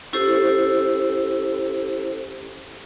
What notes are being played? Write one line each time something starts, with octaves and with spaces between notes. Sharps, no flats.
C#4 E4 G4 A4 C5